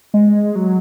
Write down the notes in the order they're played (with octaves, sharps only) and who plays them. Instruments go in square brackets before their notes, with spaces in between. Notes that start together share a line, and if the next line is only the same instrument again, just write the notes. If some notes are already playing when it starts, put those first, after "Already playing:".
[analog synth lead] G#3
F#3